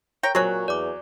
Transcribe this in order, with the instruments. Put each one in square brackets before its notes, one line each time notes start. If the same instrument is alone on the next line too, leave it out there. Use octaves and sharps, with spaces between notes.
[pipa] A#4 C#5 G5
[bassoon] A#2 [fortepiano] F#3 [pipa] C4 G#4 [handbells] C#6 F#6
[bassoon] E2 [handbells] D5 D6